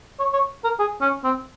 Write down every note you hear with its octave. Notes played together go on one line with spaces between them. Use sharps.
C#5
C#5
A#4
G#4
C#4
C4